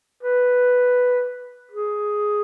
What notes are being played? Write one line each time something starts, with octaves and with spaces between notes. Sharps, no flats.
B4
G#4